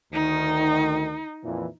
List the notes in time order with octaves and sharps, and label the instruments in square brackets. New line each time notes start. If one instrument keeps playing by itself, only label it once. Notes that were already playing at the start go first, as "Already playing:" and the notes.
[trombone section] D2 D#3 [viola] D#4
[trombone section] F2 A#2 E3